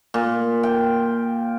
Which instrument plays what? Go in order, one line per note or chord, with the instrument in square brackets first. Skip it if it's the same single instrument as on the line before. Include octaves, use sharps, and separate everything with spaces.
[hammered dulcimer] A#2
G5